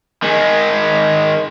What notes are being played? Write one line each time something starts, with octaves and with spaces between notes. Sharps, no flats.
D#3 G#3